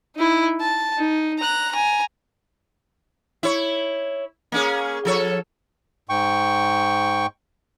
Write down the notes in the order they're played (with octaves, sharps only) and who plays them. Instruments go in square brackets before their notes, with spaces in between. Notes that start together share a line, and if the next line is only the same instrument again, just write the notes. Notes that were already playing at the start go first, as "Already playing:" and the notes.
[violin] D#4 E4
A5
D#4
A#5 F#6
G#5 A#5
[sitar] E4 C#5
A#3 C#4 G#4
F3 A4 C#5
[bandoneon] G#2 G5 C#6